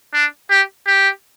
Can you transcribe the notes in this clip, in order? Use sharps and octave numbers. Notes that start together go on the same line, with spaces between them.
D4
G4
G4